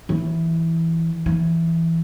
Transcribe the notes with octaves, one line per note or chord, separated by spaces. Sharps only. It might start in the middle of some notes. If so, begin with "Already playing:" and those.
E3
E3